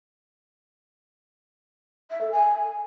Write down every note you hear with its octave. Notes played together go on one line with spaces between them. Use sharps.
E5
A4
G#5